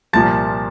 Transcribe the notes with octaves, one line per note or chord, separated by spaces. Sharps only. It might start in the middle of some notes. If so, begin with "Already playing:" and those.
C2 A#2 F3 A5 A6